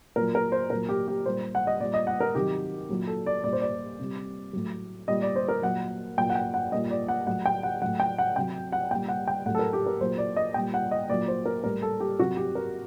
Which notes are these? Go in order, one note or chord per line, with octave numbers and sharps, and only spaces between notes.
A#2 F#3 A#4
A#4
C5
A#2 F#3 A#4
G4
G4
A#2 G3 C5
F#5
D#5
A#2 G3 D5
D#5
F#5
A#4
C3 D#3 F#3 G4
A#2 F#3
A4
D5
A#2 G3 D5
C5
D5
C3 G3
A2 F#3
A#2 G3 D#5
D5
C5
A#4
A#2 F#3 F#5
A#2 F#3 G5
F#5
G5
F#5
A#2 G3 D#5
D5
F#5
A2 F#3 F#5
G5
F#5
A2 F#3 F#5
G5
F#5
C3 F#3 G5
F#5
A#2 G3 G5
F#5
G5
A2 F#3 F#5
A4
A#4
G4
A#4
A#2 F#3 C5
D5
D#5
A#2 G3 G5
F#5
D#5
A#2 F#3 D5
C5
A#4
A2 G3 A#4
A4
G4
C3 F#3 F#4
G4
A#4